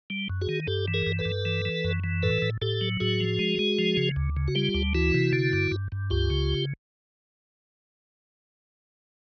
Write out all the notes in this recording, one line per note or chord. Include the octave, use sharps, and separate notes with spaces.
G3
F#2
F#4 G#4
D#3
G2 G4 A4
E3
G#4 A#4
G2
A4 B4
G2
E3
E3
F#2
E3
A2 A4 B4
A2
A2 G4 A4
F#3
A2 F#4 G#4
F3
G#3
G#3
F3
C#3
D2
C#3
F#4
G3 F4 G4
D2
E3 E4 F#4
C3
D3
G2
G2
G2
C#2 F4 G4
C#3